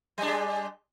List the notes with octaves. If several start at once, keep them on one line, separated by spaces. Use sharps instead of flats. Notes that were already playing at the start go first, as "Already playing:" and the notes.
G3 G#3 D4